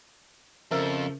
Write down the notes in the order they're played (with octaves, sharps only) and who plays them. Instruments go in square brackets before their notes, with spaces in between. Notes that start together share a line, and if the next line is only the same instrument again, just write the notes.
[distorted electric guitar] F2 [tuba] C#3 [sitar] F3 A3 A4 [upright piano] A#4 E5